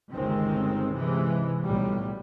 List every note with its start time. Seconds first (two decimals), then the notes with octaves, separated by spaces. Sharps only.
0.12 G1 C#2 D#3 G#3 C4
0.95 C3 E3 G#3
1.62 B1 A2 G3